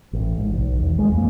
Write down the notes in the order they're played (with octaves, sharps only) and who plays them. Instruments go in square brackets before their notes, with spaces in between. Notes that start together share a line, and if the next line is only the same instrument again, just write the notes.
[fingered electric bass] A1
G#2
B1
E2 D#3
D#1 G#3
F2 G3 A#3